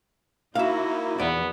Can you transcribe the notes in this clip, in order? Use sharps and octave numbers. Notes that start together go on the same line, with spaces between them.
A#3 D#4 E4 F#4 E5 F5
E2 B3 D5